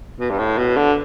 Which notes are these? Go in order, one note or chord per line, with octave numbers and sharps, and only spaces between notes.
B2
G2
A2
B2
D3